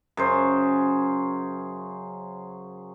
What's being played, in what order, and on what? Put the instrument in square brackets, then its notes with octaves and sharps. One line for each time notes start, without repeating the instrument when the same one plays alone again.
[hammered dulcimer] F#2 C#3 C5